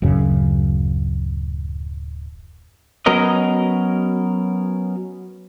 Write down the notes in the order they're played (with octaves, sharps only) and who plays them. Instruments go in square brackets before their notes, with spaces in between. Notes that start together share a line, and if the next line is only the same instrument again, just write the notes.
[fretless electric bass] D1 F#2 C#3
[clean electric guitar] F#3 B3 C#4 A#4 D#5